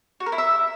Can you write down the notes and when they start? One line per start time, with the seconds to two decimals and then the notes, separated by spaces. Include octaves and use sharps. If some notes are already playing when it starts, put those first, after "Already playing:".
0.20 F#4
0.26 A#4
0.32 E4
0.38 E5